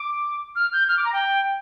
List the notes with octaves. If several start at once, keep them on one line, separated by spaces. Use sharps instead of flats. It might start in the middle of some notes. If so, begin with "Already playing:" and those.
Already playing: D6
F6
G6
F6
D6
A#5
G5